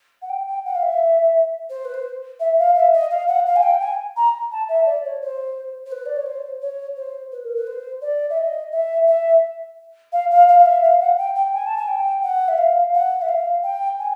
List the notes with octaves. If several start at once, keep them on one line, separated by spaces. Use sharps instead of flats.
F#5
G5
G5
F#5
F5
E5
C5
B4
C5
E5
F5
E5
D#5
F5
F#5
F5
G#5
G5
G#5
A#5
A5
E5
D5
C#5
C5
C5
B4
D5
C#5
C5
C#5
C5
B4
A#4
B4
C5
D5
E5
D#5
E5
E5
F5
F5
F5
F5
E5
F5
F#5
G5
G5
G#5
A5
G#5
G5
F#5
E5
F5
F#5
E5
F5
G5
G#5